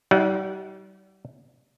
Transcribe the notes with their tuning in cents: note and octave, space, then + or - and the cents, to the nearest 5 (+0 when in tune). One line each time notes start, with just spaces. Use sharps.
G3 -35 D#4 +40 F#5 -10